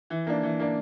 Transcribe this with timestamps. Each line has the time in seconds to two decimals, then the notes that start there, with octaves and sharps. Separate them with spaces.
0.10 E3
0.27 A#3 D4
0.43 E3
0.59 A#3 D4